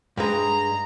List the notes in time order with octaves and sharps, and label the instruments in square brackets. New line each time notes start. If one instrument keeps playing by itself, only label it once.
[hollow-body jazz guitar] G2 G#3 [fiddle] A#5